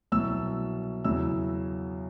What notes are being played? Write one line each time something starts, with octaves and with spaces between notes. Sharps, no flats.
C2 B2 F#3 E6
E2 C#3 F#3 E6